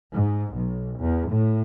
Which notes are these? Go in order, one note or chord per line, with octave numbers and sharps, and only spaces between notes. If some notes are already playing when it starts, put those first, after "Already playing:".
G#2
B1
E2
A2